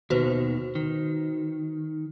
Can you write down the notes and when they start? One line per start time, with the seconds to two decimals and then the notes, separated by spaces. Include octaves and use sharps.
0.10 D#2 B2 D#3 F#4 B4 C5
0.75 D#3